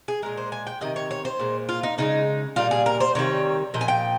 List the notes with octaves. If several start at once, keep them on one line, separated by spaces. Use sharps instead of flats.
G#4
A#2 G#3 A#4
C5
G#5
G5
C3 D#3 D#5
C#5
C#5
C5
A#2 G#3
F4
D#4
C#3 F3 G#3 D#4
A#2 G3 F4
G#4
A#4
C5
C3 D#3 G3 C#5
A#2 F3 D#5
G#5
G5